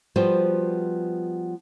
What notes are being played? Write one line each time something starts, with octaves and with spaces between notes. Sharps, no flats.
F3 G3 B3 F#4 C5